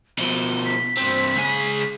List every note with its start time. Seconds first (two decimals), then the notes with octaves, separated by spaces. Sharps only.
0.18 B2 F3 G7
0.65 B6
0.97 G2 C4
1.36 C#2 G#4